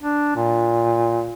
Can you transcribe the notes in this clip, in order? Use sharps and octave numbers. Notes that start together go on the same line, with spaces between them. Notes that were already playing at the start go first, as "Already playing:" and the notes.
D4
A#2